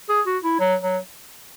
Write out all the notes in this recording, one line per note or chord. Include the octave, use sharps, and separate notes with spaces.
G#4
F#4
E4
F#3
F#3